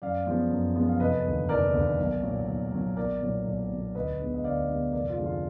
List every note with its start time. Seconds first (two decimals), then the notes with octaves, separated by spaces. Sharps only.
0.02 F#2 D5 F5
0.27 F3 G#3 B3
0.51 F#2
0.75 F3 G#3 B3
0.89 F5
1.00 F1 B4 D#5
1.26 D#2 D3
1.49 F1 A#4 D5
1.74 D#2 D3
1.98 B1
2.23 A#2 F#3 A#3
2.48 B1
2.72 A#2 F#3 A#3
2.96 B1 A#4 D5
3.22 A#2 F#3
3.46 B1
3.70 A#2 F#3
3.95 D2 B4 D#5
4.20 D3 G#3 B3
4.34 D#5
4.44 D2 D5 F5
4.69 D3 G#3 B3
4.93 F1 A#4 D5
5.10 F4
5.17 F2 D3 F3 G#3
5.26 F4